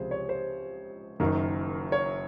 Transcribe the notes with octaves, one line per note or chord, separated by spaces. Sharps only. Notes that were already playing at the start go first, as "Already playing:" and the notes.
Already playing: C#2 C3 F3 G#4 C5
C#5
C5
F#1 F#2 D#3 A#4
C#5